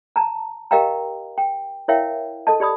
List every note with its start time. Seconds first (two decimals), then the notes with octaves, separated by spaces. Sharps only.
0.16 A5 A#5
0.71 G4 A#4 D#5 F5 G5 A#5
1.38 G5
1.88 E4 A#4 C#5 E5 F5 G5
2.47 A4 D#5 A5
2.60 G4 D5 B5 D#6